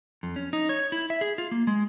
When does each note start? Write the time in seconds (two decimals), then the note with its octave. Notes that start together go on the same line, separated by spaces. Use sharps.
0.23 F2
0.36 C#4
0.53 D#4
0.69 C#5
0.92 E4
1.10 E5
1.21 G#4
1.38 F4
1.52 A#3
1.67 G#3